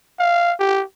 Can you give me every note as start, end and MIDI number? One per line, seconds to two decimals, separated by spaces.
0.19 0.53 77
0.60 0.83 67